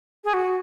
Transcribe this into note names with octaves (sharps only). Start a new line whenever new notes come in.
G#4
F#4